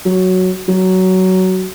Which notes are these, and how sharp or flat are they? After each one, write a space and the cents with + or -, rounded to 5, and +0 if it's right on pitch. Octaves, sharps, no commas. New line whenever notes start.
F#3 +0
F#3 +15